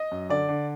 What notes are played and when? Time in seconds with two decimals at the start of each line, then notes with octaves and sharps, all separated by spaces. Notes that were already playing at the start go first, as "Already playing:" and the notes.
Already playing: D#5
0.12 F#2
0.30 D3 D5
0.49 D3